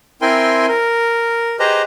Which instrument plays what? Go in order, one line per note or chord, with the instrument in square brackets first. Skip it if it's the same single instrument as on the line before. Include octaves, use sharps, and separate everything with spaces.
[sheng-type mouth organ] C4 E4 A#4 G5 G#5 C6
A#4
G4 G#4 B4 C5 D#5 A#5